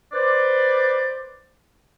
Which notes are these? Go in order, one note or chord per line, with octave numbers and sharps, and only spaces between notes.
B4 C5 D5